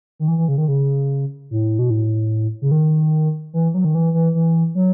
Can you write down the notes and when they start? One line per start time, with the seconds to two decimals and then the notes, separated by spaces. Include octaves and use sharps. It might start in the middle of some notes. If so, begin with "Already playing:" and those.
0.20 D#3
0.28 E3
0.38 E3
0.48 C#3
0.58 D#3
0.68 C#3
1.51 A2
1.79 B2
1.90 A2
2.62 C#3
2.71 D#3
3.54 E3
3.74 F#3
3.85 D#3
3.95 E3
4.14 E3
4.35 E3
4.75 F#3